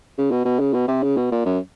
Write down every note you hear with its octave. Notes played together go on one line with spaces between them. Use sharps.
C#3
B2
B2
C#3
B2
C3
C#3
B2
A#2
F#2